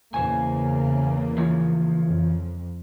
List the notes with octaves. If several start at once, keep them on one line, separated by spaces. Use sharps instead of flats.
E2 C#3 A#3 C5 G#5
E3 F3 C#5
F2